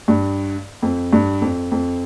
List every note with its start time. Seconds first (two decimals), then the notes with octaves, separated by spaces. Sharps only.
0.08 G2
0.82 F2
1.13 G2
1.41 F2
1.71 F2